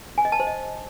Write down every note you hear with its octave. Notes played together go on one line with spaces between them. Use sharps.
G#5
D#5
A5
C5
D#5